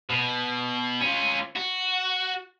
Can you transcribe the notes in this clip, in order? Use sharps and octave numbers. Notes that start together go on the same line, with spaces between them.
B2
C#4 F4
F#4